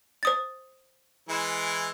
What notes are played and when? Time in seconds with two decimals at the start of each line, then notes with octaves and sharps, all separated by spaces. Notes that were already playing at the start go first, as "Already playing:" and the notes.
0.23 C5 D#6 A6
1.29 E3 G#3 E4